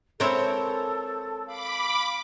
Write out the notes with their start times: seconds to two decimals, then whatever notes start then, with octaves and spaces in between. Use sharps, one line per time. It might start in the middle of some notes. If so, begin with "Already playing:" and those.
0.20 G#3 C4 E4 A4 A#4 C5 C#5
1.47 F5 B5 D6